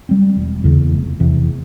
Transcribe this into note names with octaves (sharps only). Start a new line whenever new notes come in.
G3 C4
E1
E2 C#3
F1
E2 C3